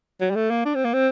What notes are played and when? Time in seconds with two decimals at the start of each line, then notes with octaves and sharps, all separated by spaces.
0.21 F#3
0.31 G3
0.35 A3
0.50 A#3
0.65 D4
0.75 C4
0.84 A#3
0.93 C4